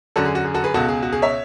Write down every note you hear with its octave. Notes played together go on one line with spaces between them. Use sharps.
F#2 D3 F#4 A4
G#4
F#4
G#4
F#4 A4
G#4 B4
C#2 B2 F#4 A4
G#4
F#4
G#4
C#5 E5